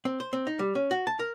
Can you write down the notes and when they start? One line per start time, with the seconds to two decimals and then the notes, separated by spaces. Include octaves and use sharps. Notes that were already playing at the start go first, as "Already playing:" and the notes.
0.05 C4
0.20 C5
0.33 C4
0.47 D#4
0.59 G3
0.75 C#4
0.91 F#4
1.07 A5
1.19 A#4